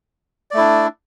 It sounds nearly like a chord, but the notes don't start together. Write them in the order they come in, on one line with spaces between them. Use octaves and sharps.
D5 A3 E4 D4